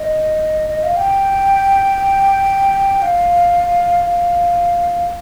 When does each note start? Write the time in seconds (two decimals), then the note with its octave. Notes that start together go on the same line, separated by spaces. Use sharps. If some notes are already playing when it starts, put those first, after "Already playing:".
Already playing: D#5
0.70 D#5
0.83 F5
0.97 G5
3.02 F5
4.05 F5